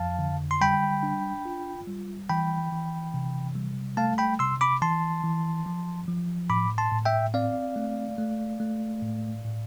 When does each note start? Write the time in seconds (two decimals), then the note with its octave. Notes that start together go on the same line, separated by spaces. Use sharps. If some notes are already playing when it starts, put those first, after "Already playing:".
Already playing: F2 F3 F5 A5
0.19 D3
0.51 C6
0.61 G3 G5 B5
1.03 D4
1.45 F4
1.87 G3
2.29 E3 G5 B5
2.72 E3
3.14 C3
3.56 G3
3.97 A3 F5 A5
4.18 G5 B5
4.39 C3 C6 E6
4.61 B5 D6
4.82 E3 A5 C6
5.24 E3
5.66 F3
6.08 F3
6.50 A2 B5 D6
6.78 A5 C6
6.92 A2
7.05 E5 G5
7.34 C4 D5 F5
7.76 A3
8.18 A3
8.60 A3
9.02 A2
9.44 A2